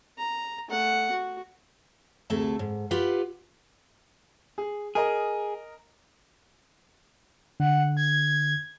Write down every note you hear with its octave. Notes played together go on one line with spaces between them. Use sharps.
A#5
A3 F#5
F#4
D2 C3 A3 G#4 A5
G#2
F4 G4 B4 F#5
G#4
G#4 A#4 D#5 A#5
D3 F#5
G#6